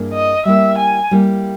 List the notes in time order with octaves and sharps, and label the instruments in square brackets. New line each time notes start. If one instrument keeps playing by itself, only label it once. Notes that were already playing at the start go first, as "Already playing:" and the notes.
Already playing: [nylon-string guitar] G2 A#3 E4 G#4
[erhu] D#5
[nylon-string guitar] G3 A#3 E4 [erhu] E5
[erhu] G#5
[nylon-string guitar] G3 A#3 E4